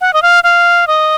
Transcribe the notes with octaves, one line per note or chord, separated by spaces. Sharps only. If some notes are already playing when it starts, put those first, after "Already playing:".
F#5
D#5
F5
F5
D#5